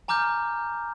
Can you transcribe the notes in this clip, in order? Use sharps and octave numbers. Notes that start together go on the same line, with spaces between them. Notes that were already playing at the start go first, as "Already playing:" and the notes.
G#5 A#5 D6 F6 G6